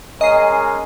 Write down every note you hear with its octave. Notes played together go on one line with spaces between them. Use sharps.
G#3 C#4 A#4 D#5 C7